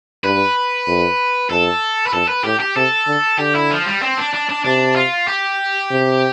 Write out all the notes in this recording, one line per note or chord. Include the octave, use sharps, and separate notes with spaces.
G2 B4
F2
F2 A4
B4
F2 A4
B4
A2 G4
G4
C3 A4
D3
D3 G4
E4
F3
G3
C4
D4
D4
D4
C3 D4
F4
G4
C3